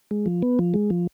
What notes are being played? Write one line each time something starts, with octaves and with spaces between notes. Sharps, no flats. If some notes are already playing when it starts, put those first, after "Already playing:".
G#3
F3
B3
F3
G#3
F3